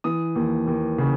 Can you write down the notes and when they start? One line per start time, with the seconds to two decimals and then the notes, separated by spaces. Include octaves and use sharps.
0.04 E3 D#6
0.35 D#2
0.67 D#2
0.98 C#3